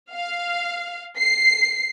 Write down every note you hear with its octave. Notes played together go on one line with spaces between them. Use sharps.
F5
C7